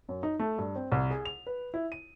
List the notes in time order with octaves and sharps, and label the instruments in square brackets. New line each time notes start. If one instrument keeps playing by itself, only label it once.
[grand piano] F#2
D#4
A3
G2
C4
C2
G#4
F7
B4
E4
D#7